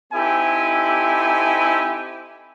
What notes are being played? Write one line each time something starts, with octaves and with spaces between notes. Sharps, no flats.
C4 D#4 E4 G4 A4 G#5